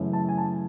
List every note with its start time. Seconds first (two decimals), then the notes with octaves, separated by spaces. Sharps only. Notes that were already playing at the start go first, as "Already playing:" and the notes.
Already playing: F#2 C#3 E3 A3
0.13 A5
0.29 G#5
0.38 A5